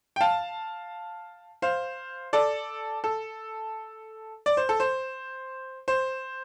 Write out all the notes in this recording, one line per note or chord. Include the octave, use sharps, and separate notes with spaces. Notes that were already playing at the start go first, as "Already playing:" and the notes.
G5
F5 A5
C5 F5
A4 D5
A4
D5
C5
A4
C5
C5